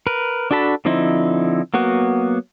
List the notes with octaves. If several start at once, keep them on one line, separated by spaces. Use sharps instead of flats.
A#4 B4
D4 F#4 A4 A5 B5
D3 F3 C4 D#4 E4
F#3 A#3 B3 F#4